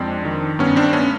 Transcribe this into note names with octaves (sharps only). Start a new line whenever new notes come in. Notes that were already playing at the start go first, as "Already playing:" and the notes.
Already playing: F2 G#3 C4 D4
D#3
G2 B3 C#4
C4 D4
A3 B3 C#4